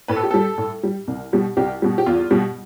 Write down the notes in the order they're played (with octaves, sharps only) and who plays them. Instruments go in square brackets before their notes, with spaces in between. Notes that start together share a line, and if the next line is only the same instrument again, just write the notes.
[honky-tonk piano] A2 B4
A4
G4
G3 A4
A2
G3
C2
B2 G3
C2 G4
B2 G3
G4
E2 F4
B2 G3